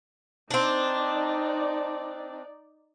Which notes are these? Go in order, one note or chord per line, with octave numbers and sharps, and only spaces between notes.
C4 D4 D#4 D5